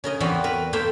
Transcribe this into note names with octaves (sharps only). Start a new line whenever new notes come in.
C#3 A#4 D#5
E2 E3 B3 C4 F#4 F5
A#4 B4
A3 A#3 A4 C5 E5 G5